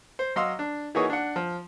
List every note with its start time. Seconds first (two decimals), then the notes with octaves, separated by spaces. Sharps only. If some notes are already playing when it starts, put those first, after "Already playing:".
0.19 C5
0.36 F#3 D#5 F5 C6 E6
0.59 D4
0.95 E3 A#3 D#4 F#4 G#4 C#5
1.10 D4 F#5
1.36 F3